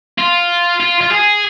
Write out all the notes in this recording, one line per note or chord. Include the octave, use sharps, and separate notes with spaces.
F4
F4
F4
G#4